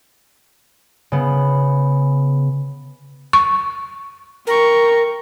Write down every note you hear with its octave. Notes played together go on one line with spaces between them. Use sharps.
C#3 B3
C#6
A#4 G5 C#6